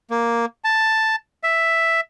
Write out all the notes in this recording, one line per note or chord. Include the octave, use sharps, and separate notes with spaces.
A#3
A5
E5